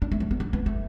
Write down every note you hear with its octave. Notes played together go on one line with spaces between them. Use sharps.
D4
A3
F#3
B3
D4
B3
A3